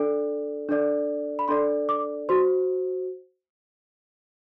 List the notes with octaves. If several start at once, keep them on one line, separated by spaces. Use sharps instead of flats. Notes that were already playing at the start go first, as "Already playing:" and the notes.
Already playing: D4 A4 D5
D4 A4 D5
B5
D4 A4 D5 C6
D6
F#4 C5 C6